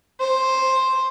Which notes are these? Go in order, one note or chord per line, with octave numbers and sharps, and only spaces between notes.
C5